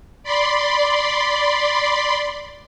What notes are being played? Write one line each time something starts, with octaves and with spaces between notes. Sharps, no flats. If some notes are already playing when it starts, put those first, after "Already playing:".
D5 B5 C6